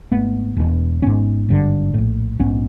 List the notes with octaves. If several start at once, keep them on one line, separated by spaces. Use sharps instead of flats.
G#1 G#2 A3 B3
E1 E2 B2
G#1 G#2 B3 C#4
G#1 G2 D3
A#1 A2
A#1 G#2 B3 C#4